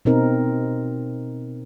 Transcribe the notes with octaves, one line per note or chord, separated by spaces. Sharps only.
B2 C4 D#4 A#4